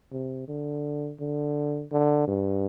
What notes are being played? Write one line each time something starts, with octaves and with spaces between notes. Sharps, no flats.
C3
D3
D3
D3
G2